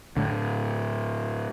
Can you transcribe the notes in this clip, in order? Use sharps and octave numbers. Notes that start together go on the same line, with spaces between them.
A2 D3